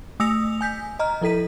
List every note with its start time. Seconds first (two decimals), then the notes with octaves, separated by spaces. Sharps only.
0.20 A3 D#6 E6 A#6 C#7 F7
0.61 G#5 G6 B6
0.99 D#5 A#5 F6
1.21 F3 E4 A4 B6 D#7